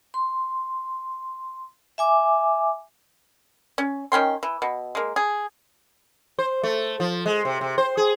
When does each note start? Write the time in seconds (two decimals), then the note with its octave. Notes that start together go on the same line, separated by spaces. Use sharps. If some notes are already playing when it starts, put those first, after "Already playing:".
0.14 C6
1.98 E5 G#5 D6
3.78 C#4
4.12 D#3 C#4 G5 C6
4.43 E3
4.62 B2
4.95 G#3 A#3
5.16 G#4
6.39 C5
6.63 A3
7.00 F3
7.26 G#3
7.45 C3
7.61 C3
7.78 C5
7.97 G#4